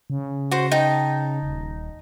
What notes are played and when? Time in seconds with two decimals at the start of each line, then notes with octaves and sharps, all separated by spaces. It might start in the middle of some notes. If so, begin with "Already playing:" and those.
0.10 C#3
0.51 F#4 C5
0.71 D#4 G5 A5
1.43 D#1